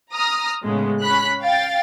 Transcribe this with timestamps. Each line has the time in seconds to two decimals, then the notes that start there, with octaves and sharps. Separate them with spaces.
0.13 A#5 D#6 F6
0.64 A2 C#3 G#3 B3
1.01 C#4 B5 F#6 B6
1.43 F5 G5 A6